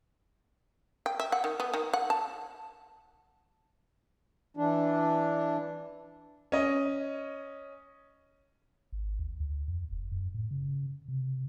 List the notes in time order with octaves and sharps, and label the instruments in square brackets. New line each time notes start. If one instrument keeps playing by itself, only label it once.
[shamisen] G5
E5
F#5
D#3
B3
D#3
F#5
A5
[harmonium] E3 D4
[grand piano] C#4 D#5
[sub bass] G#1
D#2
D2
F2
E1
F#2
A2
C#3
C3